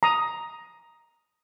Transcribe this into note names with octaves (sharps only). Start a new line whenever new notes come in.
A#5 D#6